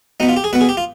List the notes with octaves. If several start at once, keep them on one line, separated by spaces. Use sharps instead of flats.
B2 B3 D#4
F4
G4
G#4
B2 B3 B4
G#4
G4
F4